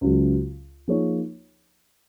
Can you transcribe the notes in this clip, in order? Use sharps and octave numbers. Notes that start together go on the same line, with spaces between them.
C#2 C#3 F#3
F3 A#3 D#4 G#4 C#5